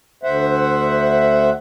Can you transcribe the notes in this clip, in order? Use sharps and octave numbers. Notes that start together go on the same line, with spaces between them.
D2 C5 E5 F#5